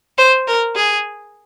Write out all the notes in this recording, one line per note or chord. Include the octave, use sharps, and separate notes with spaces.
C5
A#4
G#4